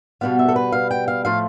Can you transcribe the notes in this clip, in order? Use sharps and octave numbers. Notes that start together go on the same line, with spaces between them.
B2 G3 B3 F5
E5
A4
B4
F5
G5
F5
A2 F3 A3 F5